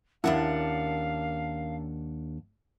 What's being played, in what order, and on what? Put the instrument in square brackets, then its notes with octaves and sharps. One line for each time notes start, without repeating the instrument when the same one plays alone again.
[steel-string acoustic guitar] D#2 D4 F#5 [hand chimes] C#4 A#4 A5 [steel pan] E4 [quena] F5